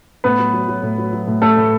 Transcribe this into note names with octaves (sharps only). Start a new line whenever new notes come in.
A2 B3 B4
F#3
F#3
F#3
A2
F#3
F#3
A2
A2 A3 A4
A2